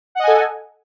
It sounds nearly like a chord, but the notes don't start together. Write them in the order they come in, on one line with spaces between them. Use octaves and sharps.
F#5 D#5 G#5 A4